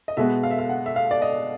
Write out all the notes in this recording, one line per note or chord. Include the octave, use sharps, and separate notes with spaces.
D#5
B2 G#3 B3 E5
F5
E5
F5
F#5
E5
F5
D5
D#5